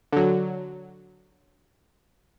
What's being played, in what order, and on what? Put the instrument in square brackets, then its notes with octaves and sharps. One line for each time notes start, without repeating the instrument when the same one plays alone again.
[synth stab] D3 F#3